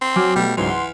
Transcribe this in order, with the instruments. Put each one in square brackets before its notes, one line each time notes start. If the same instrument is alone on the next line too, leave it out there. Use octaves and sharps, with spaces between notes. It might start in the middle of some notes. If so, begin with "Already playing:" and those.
[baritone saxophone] C4
[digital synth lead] F#3 [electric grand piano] G#5 D6 F6
[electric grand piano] B2 A3 [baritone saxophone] G3
[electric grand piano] C#2 G#2 F#3 [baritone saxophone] E3 [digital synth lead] C6
[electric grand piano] F#5